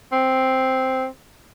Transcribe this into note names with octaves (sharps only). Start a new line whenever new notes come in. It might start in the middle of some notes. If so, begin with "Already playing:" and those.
C4